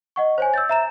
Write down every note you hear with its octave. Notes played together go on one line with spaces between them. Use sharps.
D#5 F#5 C#6
C5 C#5 G#5
E6 G6 A6
E5 A#5 E7